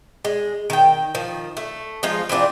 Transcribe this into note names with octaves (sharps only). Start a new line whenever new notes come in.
G#3
D#3 G5
D#3 F3
A3
F3 G#3 D#4 F4
E3 C4 D4 F4